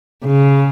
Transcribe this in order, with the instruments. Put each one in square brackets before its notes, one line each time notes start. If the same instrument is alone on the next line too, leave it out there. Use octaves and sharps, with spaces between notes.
[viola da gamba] C#3